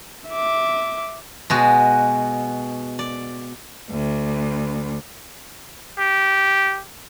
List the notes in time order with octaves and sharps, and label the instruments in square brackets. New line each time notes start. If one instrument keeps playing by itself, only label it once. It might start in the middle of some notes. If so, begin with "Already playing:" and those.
[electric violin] E5 D6
[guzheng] B2 G#3 F#4
D5
[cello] D2
[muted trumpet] G4